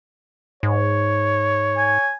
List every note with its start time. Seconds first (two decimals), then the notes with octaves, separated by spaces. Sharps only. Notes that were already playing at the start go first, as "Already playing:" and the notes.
0.63 G#2 C#5
1.77 G#5